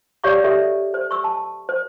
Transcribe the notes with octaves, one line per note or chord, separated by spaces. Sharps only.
G4 C#5 D5 F5 C#6 D6
G4 A4 E5
C5
C#6 E6
A5
C5